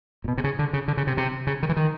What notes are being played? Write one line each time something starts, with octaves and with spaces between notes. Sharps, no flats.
A#2
B2
C3
C#3
D3
C#3
D3
C#3
C3
C3
C#3
D#3
E3
D#3